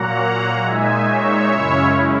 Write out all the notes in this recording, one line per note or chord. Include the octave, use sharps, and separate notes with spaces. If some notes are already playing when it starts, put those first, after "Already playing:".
Already playing: A#2 F#3 A#3 F#5 A#5
A#2 G#3 D#4 E5 G#5
C#5 E5
F#2 C#3 G#3 C#4 E4